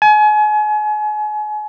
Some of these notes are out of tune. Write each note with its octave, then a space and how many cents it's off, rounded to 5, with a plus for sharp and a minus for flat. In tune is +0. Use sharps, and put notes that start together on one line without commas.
G#5 +35